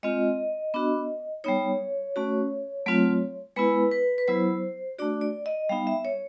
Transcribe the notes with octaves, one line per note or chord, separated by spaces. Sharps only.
G#3 C4 F4 D#5
B3 D4 F#4
G3 B3 D#4 C#5
A3 C#4 F#4
F#3 A3 C4 F4
G#3 B3 E4 B4
B4
B4
F#3 B3 E4 C5
A3 D4 F#4 D5
D5
D#5
G3 B3 D#4 F5
E5
C#5